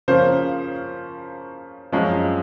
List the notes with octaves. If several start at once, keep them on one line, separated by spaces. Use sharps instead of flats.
C#3 F3 A#3 C#4 C5
F#2 F3 G#3 C#4